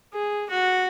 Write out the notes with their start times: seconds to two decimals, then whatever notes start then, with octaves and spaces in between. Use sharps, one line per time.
0.13 G#4
0.50 F#4